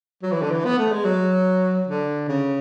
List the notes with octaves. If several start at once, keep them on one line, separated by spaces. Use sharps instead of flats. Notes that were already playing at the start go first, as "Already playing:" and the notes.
F#3
E3
D3
E3
B3
A3
G#3
F#3
D3
C#3